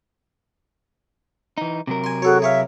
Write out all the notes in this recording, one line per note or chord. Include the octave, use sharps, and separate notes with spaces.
E3 D#4
C3 F#3 A#4
G#5 C6
F#4 G#4 A4 C#5
G#4 C#5 E5 F5